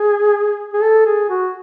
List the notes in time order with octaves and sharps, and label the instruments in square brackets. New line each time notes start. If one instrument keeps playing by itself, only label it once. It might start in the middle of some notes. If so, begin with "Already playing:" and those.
Already playing: [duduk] G#4
G#4
A4
G#4
F#4